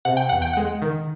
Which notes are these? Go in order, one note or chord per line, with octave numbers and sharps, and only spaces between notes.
C3 F#5
G5
E2 F#5
G5
G#3 F#5
D#3